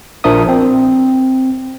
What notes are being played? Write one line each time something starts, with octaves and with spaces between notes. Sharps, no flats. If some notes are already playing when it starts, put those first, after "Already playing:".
A#1 F3 D4 A#4 E5 D#6
C4